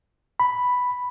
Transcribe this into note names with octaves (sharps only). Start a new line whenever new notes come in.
B5